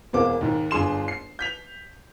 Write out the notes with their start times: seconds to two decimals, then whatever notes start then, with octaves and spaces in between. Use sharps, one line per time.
0.13 E1 E2 G#3 A#3 C5 D6
0.41 D#2 G#2
0.71 G1 D4 G#4 C6 E7
1.08 C7
1.39 G6 B6 F7